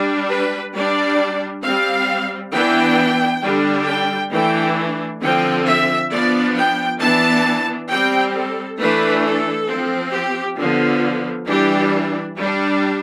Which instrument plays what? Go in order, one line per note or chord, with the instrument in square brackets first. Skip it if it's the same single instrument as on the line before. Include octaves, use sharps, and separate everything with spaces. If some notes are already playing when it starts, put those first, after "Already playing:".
Already playing: [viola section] G3 D4
B4
G3 D4 D5
G3 C4 F5
E3 B3 D4 G5
D3 G3 D4
G5
E3 A3 D4 G5
D3 F3 C4 G5
E5
F3 B3 D4 D5
G5
E3 B3 D4 A5
G3 C4 G5
A4
E3 A3 D4 B4
A4
F3 C4
G4
D3 F3 B3 F4
E3 G3 D4 G4
G3 D4